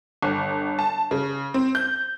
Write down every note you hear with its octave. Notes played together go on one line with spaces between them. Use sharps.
G1
A5
C#3
C4
G6